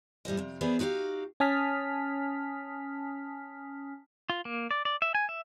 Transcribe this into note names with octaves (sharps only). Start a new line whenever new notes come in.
A2 G3 C5 D#5
F2 C3
E3 B3 G#4 B4 C5 D5
D#4 F#4 G4 C5 F5
C#4 G#5 A5 D#6 F6 B6
F4
A#3
D5
D5
E5
G#5
E5